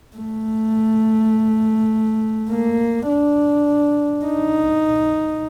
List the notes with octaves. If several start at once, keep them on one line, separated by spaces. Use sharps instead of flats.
A3
A#3
D4
D#4